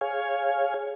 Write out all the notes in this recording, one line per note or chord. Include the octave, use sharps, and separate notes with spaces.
G#4 C#5 F5 G#5